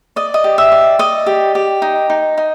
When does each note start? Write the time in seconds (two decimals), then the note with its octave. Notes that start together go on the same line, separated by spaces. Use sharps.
0.16 D5 D#5
0.34 D#5
0.44 G4
0.58 E5
0.72 D5
0.99 D5 D#5
1.26 G4
1.55 G4
1.82 D#4
2.10 D#4
2.38 D#4